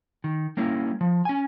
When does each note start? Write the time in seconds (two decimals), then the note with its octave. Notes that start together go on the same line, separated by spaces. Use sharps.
0.24 D#3
0.57 G3 A#3 C#4 E4
1.01 F3
1.25 C#4 G#5